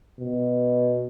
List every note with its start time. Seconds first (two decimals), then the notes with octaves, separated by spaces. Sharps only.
0.19 B2